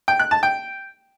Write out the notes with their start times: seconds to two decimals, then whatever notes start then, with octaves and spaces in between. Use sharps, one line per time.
0.08 G5
0.20 F#6
0.31 A5
0.43 G5